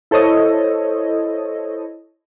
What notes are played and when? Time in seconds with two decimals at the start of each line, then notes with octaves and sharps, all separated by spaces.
0.11 E4 A4 C5 C#5 D#5